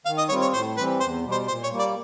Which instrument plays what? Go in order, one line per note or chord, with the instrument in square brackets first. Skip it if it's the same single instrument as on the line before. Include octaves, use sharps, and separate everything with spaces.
[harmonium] D#3 [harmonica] F5
[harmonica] D#5
[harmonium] G3 C4 F4 [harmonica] C#5
[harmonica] C#5
[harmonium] A2 [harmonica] C5
[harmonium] E3 G3 C4 [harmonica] B4
[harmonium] E2 [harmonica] C5
[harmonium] B2 G3
[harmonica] C5
[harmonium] A#2 [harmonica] C5
[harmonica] C#5
[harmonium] G3 A#3
[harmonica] D5